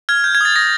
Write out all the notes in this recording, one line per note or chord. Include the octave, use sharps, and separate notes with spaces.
F6 G#6
G6
G#6
D#6 A6
D#6 A#6